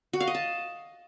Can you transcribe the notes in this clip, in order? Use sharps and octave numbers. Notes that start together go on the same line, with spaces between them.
F#4
F5
D#5
A5